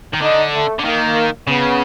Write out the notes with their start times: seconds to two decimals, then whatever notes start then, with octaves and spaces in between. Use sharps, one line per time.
0.14 D#3
0.22 D3 D#4
0.53 A3
0.79 D3
0.84 D#3 A#3
1.47 C#3 B3